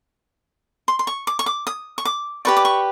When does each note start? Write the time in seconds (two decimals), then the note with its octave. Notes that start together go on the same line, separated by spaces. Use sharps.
0.88 C6
0.99 C6
1.07 C#6
1.27 D6
1.39 C#6
1.46 D6
1.67 D#6
1.98 C#6
2.05 D6
2.45 G4 B4 D5 C#6
2.57 D6
2.65 C#6